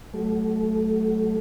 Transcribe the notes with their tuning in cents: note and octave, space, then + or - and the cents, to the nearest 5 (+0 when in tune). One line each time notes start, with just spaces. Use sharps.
F#3 +15 A3 -10